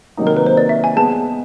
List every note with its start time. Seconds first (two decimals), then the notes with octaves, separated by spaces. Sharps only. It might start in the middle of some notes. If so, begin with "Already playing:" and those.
0.17 C3 D#3 F#3 A#3 D#4
0.27 A#4
0.37 B4
0.46 C5
0.57 D5
0.69 E5
0.84 G#5
0.96 G#3 B3 A5